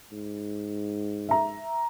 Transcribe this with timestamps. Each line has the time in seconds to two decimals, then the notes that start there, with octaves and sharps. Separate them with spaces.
0.12 G#2
1.29 E5 A#5